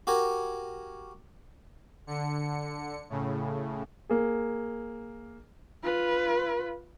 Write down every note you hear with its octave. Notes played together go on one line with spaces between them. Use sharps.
F#4 G4 A#4 G#5
D3 C#7
A2 C#3
A#3 G#4
F4 B4